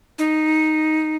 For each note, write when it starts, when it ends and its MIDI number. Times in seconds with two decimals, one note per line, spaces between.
0.19 1.16 63